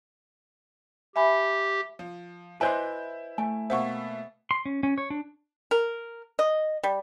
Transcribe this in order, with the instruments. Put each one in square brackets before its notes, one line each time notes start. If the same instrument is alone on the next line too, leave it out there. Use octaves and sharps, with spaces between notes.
[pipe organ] G4 [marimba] E5 G#5 B5
[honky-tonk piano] F3
[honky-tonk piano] E4 G6 [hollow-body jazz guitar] B4 D#5 C6 [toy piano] C5 G#5
[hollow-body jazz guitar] A3 [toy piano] G#5
[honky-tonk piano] B2 A#3 E5 [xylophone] C5 F#5 C#6
[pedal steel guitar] C6
C#4
C#4
C#5
D4
[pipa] A#4
D#5
G3